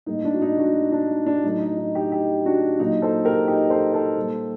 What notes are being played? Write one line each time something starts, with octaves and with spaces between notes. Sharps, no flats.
A2 G3 A#3 D#4
D4
F#4
D#4
D4 F#4
D4
D#4
D4
A2 F#3 A3 D#4
D#4
D#4
D#4 G4
D#4 G4
D4 F#4
A#2 F#3 A#3 D#4
A4 C5
G4 A#4
D#4 G4
A4 C5
A4 C5
A#2 G3 A#3